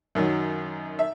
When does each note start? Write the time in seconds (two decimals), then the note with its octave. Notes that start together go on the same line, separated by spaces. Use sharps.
0.15 F#2 D#3 F#3
0.99 E5